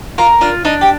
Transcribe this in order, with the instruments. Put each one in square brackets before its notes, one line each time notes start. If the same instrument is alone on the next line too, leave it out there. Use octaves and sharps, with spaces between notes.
[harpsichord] F4 [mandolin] A#4
[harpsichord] D4 [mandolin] F4
[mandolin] D4 [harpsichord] D#4
[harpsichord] G4